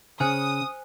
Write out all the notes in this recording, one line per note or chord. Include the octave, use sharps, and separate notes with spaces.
C#3 C5 G#5 D#6 F#6